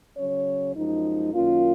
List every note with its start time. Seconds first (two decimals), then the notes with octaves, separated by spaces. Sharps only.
0.17 C#3 F#3 C#4 C#5
0.75 F#2 F3 G#3 D#4
1.33 F#2 D#3 A#3 C#4 F4